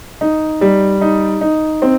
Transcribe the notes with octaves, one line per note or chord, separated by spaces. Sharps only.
D#4
G3
D#4
D#4
C4